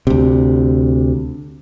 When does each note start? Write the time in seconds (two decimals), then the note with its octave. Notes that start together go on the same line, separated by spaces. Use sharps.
0.07 D2 C3